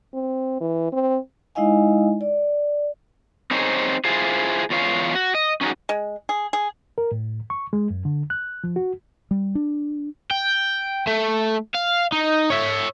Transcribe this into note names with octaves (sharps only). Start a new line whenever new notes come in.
C4
E3
C4
G#3 D#4 E4 D#5 F5 G#5
D5
C4 D#4 G#4 C5 C#5
E4 F4 G#4 C5
E2 F4 C#5 F5
F#4
D#5
C#4 D#4 E4 F#4 G#4
G#3
G#4
G#4
A#4
A2
C#6
G#3
F#2
D3
F#6
F3
F#4
G3
D4
G5
A3
F5
D#4
C#5 E5